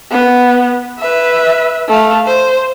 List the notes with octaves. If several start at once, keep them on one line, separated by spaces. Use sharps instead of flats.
B3
B4 E5
A3 F5
C5